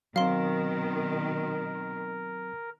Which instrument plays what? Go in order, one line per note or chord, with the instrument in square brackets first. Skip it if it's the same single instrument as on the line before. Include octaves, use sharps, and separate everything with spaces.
[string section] B2 D#3 [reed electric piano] F#3 C4 [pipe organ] A#4 [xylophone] F5 C6